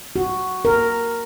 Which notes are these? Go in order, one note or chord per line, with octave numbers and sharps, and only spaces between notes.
F#4
A#4